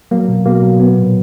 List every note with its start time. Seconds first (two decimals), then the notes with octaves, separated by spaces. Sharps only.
0.11 F#3 A#3
0.28 B2
0.46 B2 A#3
0.62 F#3
0.79 F#3 B3
0.97 A#2